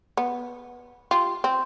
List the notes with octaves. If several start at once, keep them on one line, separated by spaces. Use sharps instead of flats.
B3
F4 G4
C4